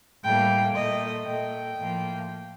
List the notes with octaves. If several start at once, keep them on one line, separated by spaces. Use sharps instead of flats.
A2 G3 A#3 G5
A#2 A3 D#5
A#2 A3 G5
A2 F3 A#3